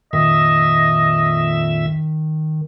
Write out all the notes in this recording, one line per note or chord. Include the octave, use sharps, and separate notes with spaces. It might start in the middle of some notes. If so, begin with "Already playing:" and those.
F2 A#2 D#3 D#5 E5